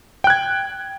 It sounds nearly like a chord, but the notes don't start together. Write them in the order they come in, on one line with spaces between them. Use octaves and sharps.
G5 F#6 G#6